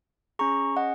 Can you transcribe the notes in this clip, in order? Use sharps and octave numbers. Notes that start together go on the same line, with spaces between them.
C#4 G#4 A#5 C#6
D#5 F#5